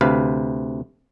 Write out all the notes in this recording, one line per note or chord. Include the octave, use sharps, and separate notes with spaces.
D2 C3 B4 F5